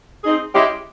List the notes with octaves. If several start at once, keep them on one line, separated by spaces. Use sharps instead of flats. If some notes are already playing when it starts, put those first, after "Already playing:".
C4 D#4 G#4
G#3 C#4 E4 G4